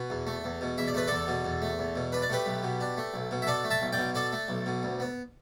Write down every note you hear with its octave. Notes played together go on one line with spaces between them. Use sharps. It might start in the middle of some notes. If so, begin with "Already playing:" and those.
Already playing: B2 B4
E2
A3
E2
B2
E2 E5
D5
A3 B4
E2 A4 D5
B2
E2
A3
E2
B2
D4 B4
D5
A3 G4 B4
B1
B2
D4
A3
B1
B2
E5
D4 A4 D5
A3
E5 A5
B1
D5 G5
B2
D4 A4 D5
A3
B1
B2
D2
B3